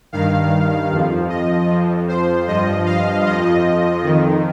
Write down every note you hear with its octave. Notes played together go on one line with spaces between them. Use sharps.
G2 D#3 F5
F2 F3
D#5
F2 F3
C5
G2 F3 D#5
F5
F2 F3 D#5
F2 D#3